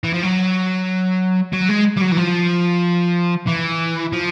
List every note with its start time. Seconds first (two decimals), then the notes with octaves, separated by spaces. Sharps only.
0.03 E3
0.13 F3
0.23 F#3
1.53 F#3
1.69 G#3
1.97 G3
2.02 F#3
2.12 E3
2.17 F3
3.48 E3
4.12 F3